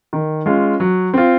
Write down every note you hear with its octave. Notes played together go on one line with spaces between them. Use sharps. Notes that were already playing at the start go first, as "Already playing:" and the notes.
D#3
G#3 C#4 F4
F#3
C4 F4